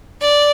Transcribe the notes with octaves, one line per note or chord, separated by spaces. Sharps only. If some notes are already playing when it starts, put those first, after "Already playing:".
D5